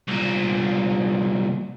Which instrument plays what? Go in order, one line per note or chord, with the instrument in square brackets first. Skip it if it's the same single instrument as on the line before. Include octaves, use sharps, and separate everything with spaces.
[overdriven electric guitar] C2 A#2